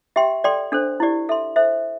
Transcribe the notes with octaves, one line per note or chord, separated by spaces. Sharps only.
G4 E5 G5 C6
A4 D5 G5 C6
D4 A4 C5
E4 G4 D5
A4 E5 C6
A4 C5 E5